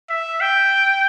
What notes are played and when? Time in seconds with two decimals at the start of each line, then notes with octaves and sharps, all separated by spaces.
0.10 E5
0.41 G5